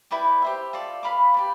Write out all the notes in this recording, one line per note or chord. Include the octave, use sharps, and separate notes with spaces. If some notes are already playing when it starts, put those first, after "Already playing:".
E4 B4 D5 G5
G4 C5 E5
F4 A4 D5
B4 F5 B5 D6
G4 B4 D5